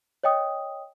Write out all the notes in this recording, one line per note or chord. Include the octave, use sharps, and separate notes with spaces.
C#5 D#5 G5 D#6